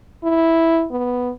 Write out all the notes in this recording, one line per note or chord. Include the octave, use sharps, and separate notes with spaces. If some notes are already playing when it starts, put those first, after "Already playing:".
E4
B3